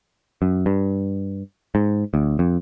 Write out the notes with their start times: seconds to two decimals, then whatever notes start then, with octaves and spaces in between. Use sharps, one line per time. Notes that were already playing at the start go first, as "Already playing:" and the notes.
0.42 F#2
0.66 G2
1.75 G#2
2.14 D2
2.39 F2